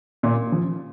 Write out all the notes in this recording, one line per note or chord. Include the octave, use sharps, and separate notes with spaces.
A#2
F3